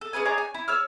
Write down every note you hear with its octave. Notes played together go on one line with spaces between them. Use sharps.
A4
C#4 G#4 B4 G#5
D4 D#4 G#4 C#5
G#5
E4
C#5 E6 F6